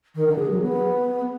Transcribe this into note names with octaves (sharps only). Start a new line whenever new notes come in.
D#3
D3
G#4
F#3
B3